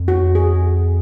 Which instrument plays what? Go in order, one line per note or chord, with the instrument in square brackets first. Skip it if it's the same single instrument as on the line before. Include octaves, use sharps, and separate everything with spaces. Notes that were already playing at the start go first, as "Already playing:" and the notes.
Already playing: [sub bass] F2
[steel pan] F#4
G#4